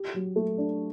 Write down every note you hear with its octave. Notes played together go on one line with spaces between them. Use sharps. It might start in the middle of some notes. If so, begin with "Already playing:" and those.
Already playing: G4
F#3
A3
D4